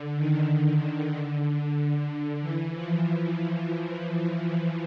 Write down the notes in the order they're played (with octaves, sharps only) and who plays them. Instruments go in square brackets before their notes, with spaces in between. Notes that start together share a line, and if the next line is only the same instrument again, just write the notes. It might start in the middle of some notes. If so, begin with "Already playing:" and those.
Already playing: [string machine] D3
D#3
D#3
D3
E3
F3